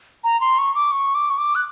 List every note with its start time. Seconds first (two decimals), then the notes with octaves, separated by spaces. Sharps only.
0.24 A#5
0.41 C6
0.59 C#6
0.75 D6
0.92 C#6
1.15 D6
1.30 C#6
1.38 D6
1.55 F#6